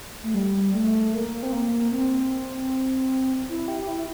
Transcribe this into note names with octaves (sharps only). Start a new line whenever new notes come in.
A3
G3
A3
A#3
C4
A#3
C4
E4
G4
E4